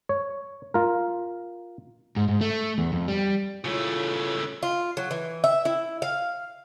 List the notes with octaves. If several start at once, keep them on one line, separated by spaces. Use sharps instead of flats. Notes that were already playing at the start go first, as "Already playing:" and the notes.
C#5
F4 A#4
G#2
G#2
A3
E2
F2
G3
C#3 A3 E4 F4 C#5
F4
F#3
E3
E5
E4
F5